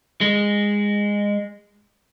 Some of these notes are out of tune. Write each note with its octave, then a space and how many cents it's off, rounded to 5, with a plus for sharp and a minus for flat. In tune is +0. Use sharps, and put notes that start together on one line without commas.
G#3 -15